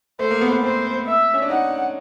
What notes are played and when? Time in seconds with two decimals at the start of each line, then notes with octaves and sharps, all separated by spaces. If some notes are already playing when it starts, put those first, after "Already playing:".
0.19 A3 C5
0.31 A#3
0.41 B3
0.52 B3
0.63 C4 C5
1.06 E5
1.34 C#4
1.42 D4
1.50 D#4 F#5